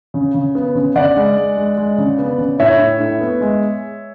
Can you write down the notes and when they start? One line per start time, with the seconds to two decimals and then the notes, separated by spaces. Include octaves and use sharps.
0.14 C#3
0.34 C#3
0.55 B3
0.75 C#3
0.95 C#3 D5 F#5
1.16 G#3
1.36 G#3
1.57 G#3
1.78 G#3
1.98 C#3
2.19 B3
2.38 C#3
2.59 A2 C#5 E5
2.79 A2
3.00 A2
3.21 B3
3.41 G#3